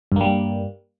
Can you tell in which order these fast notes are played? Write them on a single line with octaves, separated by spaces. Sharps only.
G2 A#3 G3